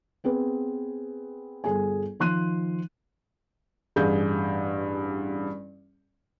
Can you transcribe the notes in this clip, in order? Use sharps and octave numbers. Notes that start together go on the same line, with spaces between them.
B3 C4 G#4 B4
G1 G#4 A4 G#5
D#3 F3 C6 F#6 D#7
A1 G2 G#4 G6